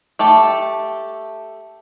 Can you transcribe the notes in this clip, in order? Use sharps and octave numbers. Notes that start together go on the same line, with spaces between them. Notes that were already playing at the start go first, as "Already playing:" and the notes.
A3 G4 A5